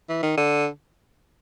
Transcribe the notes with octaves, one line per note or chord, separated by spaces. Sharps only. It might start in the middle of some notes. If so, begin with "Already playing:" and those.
E3
D#3
D3